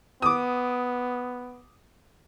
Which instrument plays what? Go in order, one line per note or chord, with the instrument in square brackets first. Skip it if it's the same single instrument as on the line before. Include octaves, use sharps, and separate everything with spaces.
[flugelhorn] B3 [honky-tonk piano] D6 D#6